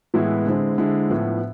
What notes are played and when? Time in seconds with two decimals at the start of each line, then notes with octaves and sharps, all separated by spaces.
0.14 A2 E3 G#3 B3 E4
0.45 D3 G#3 C4 E4
0.78 D3 G#3 C4 E4
1.10 A2 F3 B3